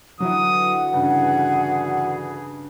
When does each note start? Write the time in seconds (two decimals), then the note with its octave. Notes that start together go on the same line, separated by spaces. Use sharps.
0.20 D3 E3 F#3 E4 F#4 F#5 D#6
0.93 G2 C#3 G#4